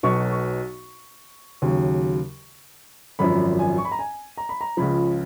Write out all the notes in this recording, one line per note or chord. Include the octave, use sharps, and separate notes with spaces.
B1 B2 F#3 C#6
C#6
D#2 C#3 F#3
G#1 F#2 F3 B5
G#5
C#6
B5
A#5
G#5
A#5
B5
A#5
C#2 C#3 F3 B5